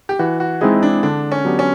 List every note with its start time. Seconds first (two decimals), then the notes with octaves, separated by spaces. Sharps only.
0.09 G4
0.19 E3 F#4
0.40 F#4
0.61 G#3 C4 D#4 E4 G#4
0.83 D4
1.03 D3 D4
1.32 C#4
1.45 F#3 B3 D4 G4
1.59 C#4